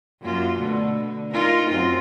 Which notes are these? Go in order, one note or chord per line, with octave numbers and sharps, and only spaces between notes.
F#2 A#3 F4
B2 D3 A3
D3
D#4 F4 A#4
F#2 C4 F4